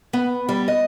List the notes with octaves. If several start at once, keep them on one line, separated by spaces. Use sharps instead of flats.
B3
G3
D#5